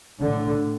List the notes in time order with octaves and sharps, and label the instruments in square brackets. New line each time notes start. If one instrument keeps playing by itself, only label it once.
[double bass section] A2 D3